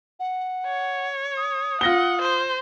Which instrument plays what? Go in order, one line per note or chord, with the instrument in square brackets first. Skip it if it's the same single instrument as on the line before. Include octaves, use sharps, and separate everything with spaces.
[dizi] F#5
[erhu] C#5
[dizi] D#6
[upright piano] F4 A#6 G7 [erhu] F#5
[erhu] C5